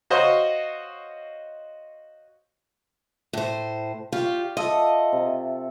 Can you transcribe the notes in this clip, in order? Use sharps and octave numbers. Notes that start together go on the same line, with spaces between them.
F#4 C5 C#5 D#5 F5 C6
A2 C5
F4 G4 D5 C#6
F4 A4 D#5 E5
C3